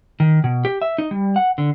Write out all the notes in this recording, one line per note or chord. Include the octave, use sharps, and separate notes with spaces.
D#3
B2
G4
E5
D#4
G3
F#5
D3